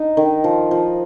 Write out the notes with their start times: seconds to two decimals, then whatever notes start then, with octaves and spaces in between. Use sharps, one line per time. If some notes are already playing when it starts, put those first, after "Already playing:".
Already playing: D#4
0.17 D#3
0.44 F3
0.71 F3